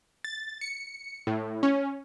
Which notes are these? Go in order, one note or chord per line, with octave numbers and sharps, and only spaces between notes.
A6
C#7
A2
C#4